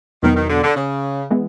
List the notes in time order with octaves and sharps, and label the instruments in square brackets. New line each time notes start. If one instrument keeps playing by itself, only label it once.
[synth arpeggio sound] E2 B2 F#3 B3 [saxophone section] D#3
[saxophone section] D#3
D3
D3
C#3
[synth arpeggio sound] E3 G#3 B3